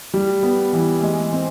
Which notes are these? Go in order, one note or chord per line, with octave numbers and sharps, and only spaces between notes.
G3
B3
E3
G#3
C4